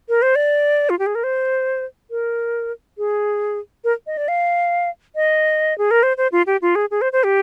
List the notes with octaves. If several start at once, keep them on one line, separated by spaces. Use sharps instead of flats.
A#4
C5
D5
F4
G4
G#4
A#4
C5
A#4
G#4
A#4
D#5
D5
F5
D#5
G#4
A#4
C5
C5
F4
G4
F4
G#4
G#4
C5
C5
G4